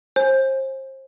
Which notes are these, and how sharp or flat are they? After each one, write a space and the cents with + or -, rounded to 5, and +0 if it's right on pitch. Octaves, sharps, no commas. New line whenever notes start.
C5 +30 G#5 +0